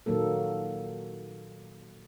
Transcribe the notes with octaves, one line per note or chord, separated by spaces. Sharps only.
A#2 D#3 F#3 A#3 A4